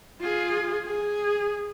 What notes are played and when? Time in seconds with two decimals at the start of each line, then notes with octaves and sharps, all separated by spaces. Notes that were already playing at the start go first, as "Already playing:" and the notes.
0.20 F4 G#4
0.85 G#4